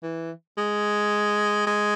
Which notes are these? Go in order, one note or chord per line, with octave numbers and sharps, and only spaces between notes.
E3
G#3
G#3